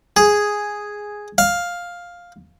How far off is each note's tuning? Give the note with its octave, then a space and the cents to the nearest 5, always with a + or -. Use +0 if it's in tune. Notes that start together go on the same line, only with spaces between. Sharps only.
G#4 +0
F5 +5